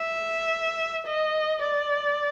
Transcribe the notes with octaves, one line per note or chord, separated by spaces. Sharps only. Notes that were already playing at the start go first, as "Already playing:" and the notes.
Already playing: E5
D#5
D5